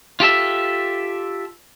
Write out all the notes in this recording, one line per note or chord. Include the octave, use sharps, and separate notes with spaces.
F4 G4 A4 E5